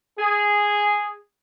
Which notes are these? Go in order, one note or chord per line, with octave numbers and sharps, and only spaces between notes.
G#4